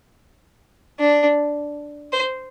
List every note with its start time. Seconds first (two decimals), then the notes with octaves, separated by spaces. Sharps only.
0.99 D4
2.12 C5